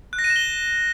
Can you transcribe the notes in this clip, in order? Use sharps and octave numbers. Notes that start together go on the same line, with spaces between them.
F#6
A#6
D#7
E7
G7